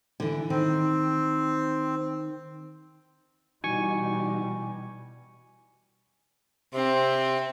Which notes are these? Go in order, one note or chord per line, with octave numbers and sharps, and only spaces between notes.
D3 E3
D#3 C4
B2 E3 G3 D#4 F#4 G#5 C#6
C3 C4